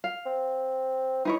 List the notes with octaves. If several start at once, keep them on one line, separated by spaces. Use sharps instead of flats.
F5
C4
E3 D#4 E4 C#5